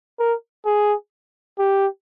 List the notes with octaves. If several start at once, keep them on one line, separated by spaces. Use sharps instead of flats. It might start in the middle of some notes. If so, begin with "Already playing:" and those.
A#4
G#4
G4